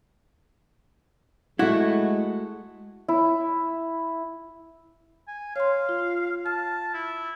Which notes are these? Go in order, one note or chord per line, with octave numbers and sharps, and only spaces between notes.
G#3 A3 E4 F#4
E4
G#5
C#5 F5 C6
F4
A5 F6
E4